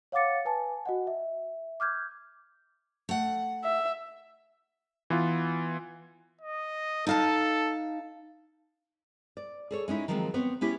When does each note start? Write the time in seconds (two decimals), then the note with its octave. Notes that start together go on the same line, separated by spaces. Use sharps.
0.12 C#5 F5 F#5 D6 A6 C#7
0.45 B4 G#5 A5
0.86 F#4 D#5 F#5
1.07 E5
1.80 D6 F6 G6 G#6
3.09 A3 F#5
3.64 E5
5.10 E3 B3 F4
6.41 D#5
7.07 D#4 A4 F5 A5
9.37 D5
9.71 G#4 A4 C#5
9.88 G#3 C#4 D#4 E4
10.08 D#3 F3 F#3 G#3 A#3 C4
10.34 B3 C4 C#5
10.61 B3 C#4 E4 G4 C#5